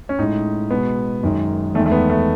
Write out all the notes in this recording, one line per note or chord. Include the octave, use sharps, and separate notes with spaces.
C#4
A2 G#3 D#4
B2 G#3 B3
F#2 D#3 G#3
E2 D#3 G#3 A3
A3
B3
A3